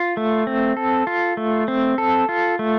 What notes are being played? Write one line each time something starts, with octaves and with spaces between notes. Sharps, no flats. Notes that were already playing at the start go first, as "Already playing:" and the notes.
Already playing: F4
A3
C4
A4
F4
A3
C4
A4
F4
A3